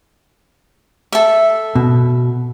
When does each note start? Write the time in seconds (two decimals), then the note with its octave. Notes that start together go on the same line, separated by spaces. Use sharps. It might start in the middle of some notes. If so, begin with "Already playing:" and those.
1.12 A4 E5
1.75 B2